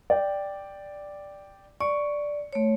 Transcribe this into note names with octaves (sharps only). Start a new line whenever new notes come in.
D5 G5
D5 C#6
A3 C#5